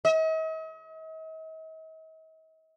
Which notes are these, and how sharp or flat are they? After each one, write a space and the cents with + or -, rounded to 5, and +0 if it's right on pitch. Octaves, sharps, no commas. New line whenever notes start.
D#5 +45